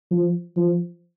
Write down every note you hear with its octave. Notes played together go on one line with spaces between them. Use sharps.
F3
F3